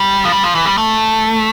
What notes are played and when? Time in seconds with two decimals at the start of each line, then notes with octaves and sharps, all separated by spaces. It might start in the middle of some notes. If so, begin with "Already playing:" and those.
Already playing: G3
0.25 F3
0.32 G3
0.43 F3
0.55 E3
0.66 G3
0.78 A3